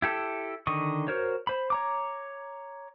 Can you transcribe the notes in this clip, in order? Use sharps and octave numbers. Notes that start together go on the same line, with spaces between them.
E4 G4 A4
D3 D#3 D#5 C#6
F#4 A#4 C5 C#5
C5 B5
C#5 A#5 D6